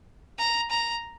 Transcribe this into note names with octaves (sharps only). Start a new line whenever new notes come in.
A#5
A#5